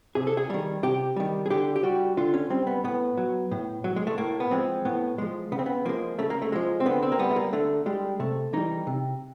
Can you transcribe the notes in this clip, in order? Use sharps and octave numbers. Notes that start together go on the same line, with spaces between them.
C3 G#4
A4
G#4
D#3 G3
C3 G4
D#3 G3
G#4
D3 G4
G4
G3 F#4
D3 F4
C#4
G3 C4
B3
A2 B3
F#3
A2
F#3
G#3
A3
A2 A#3
B3
F3 G#3 C4
A2 B3
F3 G#3
C#3 B3
C4
B3
F3 G#3 A#3
C#3 A3
A#3
A3
F3 G#3
C4
D3 B3
C4
A#3
G3 B3
A3
A#3
D3 A3
G3 G#3
C3 A3
E3 G3 D#4
C3